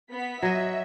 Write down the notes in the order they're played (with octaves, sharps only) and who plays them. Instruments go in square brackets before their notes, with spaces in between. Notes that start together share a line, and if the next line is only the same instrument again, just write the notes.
[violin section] B3 B6
[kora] F#3 D#5 [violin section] E5